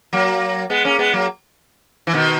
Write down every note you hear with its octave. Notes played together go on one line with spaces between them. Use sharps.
F#3 A#3
G#3 B3
A#3 C#4
G#3 B3
F#3 A#3
E3
B2 D#3